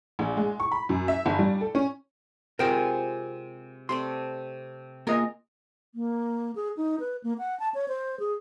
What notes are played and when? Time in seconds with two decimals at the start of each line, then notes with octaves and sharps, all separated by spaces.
0.19 A#1
0.37 G#3
0.60 C#6
0.72 B5
0.89 F#2
1.08 E5
1.26 G1
1.39 G3
1.61 A4
1.75 C#4
2.59 C3 G#3 F4 A#4 C5 G5
3.89 C3 A3 D5 C6
5.07 A#3 F4 G#4 A#4 D#5
5.95 A#3
6.56 G#4
6.77 D#4
7.00 B4
7.24 A#3
7.39 F#5
7.60 A5
7.74 C#5
7.88 C5
8.20 G#4